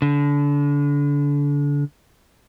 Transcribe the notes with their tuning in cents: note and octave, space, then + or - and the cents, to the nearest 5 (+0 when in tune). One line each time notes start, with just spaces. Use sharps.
D3 -30